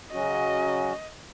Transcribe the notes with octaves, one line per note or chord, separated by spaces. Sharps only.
C#3 F#3 C#4 F#4 D#5